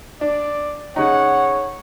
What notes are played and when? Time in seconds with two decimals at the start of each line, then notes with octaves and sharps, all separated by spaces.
0.21 D4 D5
0.96 C#3 D#4 C#5 F#5